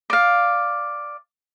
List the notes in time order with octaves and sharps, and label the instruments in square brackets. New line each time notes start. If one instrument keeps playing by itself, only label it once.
[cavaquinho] D5 F5